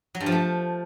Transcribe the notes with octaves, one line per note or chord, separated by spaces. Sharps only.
F#3
G2
F3
A3